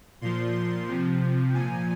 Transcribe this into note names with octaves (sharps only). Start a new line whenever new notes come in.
A#2 F3 C6
C6
C3 F3
A#2 F3 G#5